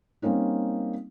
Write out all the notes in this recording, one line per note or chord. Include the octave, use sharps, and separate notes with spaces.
G3 A#3 C4 C#4 D#4